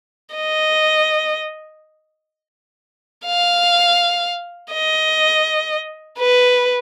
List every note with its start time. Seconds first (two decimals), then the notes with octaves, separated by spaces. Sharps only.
0.35 D#5
3.26 F5
4.73 D#5
6.19 B4